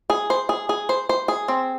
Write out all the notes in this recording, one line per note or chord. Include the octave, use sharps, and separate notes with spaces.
G#4
C5
G#4
G#4
C5
C5
G#4
C4